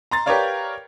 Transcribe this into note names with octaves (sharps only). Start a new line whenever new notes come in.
A#5 C6 A6
G4 A#4 B4 C#5 D5 F5